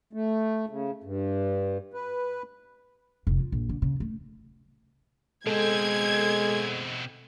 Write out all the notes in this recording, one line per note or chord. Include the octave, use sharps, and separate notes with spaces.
A3
C#3
G2
B4
F1
F4
A#1
D3
C#3
A3
B2 G#3 C4 A4 G#6